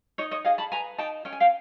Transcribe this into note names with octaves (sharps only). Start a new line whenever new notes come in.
D#4 C#5 D#5
C#5 D#5
G#4 D#5 F5
A5 B5
B4 G#5 A#5
D#4 G5 A5
C#4 G5
G#5
F5 G5